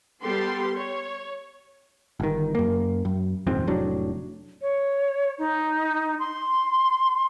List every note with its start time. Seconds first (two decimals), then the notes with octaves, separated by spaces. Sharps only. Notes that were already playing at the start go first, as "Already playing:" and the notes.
0.22 G3 B3 G4 A4 C6
0.75 C#5
2.20 G1 D#3
2.55 F#2 A#3
3.05 F#2
3.47 D#1 F2 G#2 C4
3.67 F1 A2 F#3 D4
4.62 C#5
5.38 D#4
6.19 C6